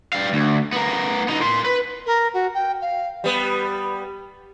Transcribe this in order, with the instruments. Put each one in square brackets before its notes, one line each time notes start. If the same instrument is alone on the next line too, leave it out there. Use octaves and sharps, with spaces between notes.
[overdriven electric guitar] G3 F5
D2
B3 A#4
B3 D#4
A#4 C6
B4
[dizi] A#4
F#4
G5
F5
[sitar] G3 B3